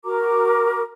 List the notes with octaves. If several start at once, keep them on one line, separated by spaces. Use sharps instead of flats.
F#4 A#4 A#5 D6